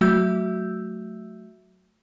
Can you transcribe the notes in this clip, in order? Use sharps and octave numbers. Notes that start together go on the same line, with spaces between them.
F#3 A3 F#4 E5 E6 G6